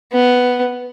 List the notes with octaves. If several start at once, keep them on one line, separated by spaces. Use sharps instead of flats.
B3